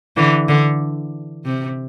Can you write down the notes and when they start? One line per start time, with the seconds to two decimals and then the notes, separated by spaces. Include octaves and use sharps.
0.17 D3 E3
0.49 D3
1.45 C3